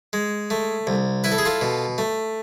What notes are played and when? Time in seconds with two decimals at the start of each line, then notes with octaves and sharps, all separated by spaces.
0.13 G#3
0.50 A3
0.87 C2
1.24 E4 B4
1.32 A4
1.38 G#4
1.45 F4 A4
1.61 B2
1.98 A3